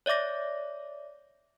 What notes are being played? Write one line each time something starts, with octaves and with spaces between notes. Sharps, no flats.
C#5 D5 E5 D6 A#6